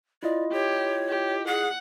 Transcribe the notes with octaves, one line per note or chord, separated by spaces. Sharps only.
E4 F4 D5 D#5
G4 C#5
G4
G#4 F#5